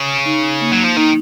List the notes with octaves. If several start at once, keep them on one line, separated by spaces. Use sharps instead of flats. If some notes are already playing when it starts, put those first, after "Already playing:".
Already playing: C#3
D#4
A#3
F#3
F3
D#3 D#4